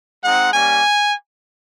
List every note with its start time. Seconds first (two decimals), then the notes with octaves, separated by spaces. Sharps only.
0.23 G#3 C4 D#4 F#5
0.53 G3 A#3 C#4 G#5